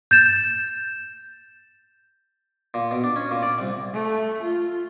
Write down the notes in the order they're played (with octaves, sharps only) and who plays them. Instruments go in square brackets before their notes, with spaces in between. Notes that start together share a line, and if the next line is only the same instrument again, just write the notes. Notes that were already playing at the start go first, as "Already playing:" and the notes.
[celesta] G6 A6 E7
[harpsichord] A#2
B2
D4
C#4
A#2
D5
C2
[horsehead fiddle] A3
F4